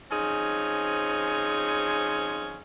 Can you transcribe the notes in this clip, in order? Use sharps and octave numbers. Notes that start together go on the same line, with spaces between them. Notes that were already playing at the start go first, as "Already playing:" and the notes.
F3 C4 C#4 D#4 G#4